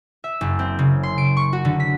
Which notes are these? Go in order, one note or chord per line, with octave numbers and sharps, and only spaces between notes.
E5
F#1
C4
C#3
C6
D7
C#6
F#4
D3
B6